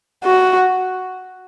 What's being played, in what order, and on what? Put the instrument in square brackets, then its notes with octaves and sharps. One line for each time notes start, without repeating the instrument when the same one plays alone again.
[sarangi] F#4